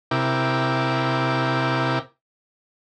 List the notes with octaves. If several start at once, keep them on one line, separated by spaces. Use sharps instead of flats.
C3 E4 A#4 G5 D6